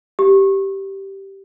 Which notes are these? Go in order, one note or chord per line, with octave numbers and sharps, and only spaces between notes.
G4